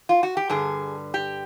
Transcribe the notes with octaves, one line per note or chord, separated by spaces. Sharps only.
F4
F#4
G4
G2 D3 G3 G#4
G4